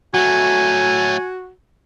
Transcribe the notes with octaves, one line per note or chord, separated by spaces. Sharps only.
F#3 A3 F#4 G#5